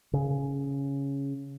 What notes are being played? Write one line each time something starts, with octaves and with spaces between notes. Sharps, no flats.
C#3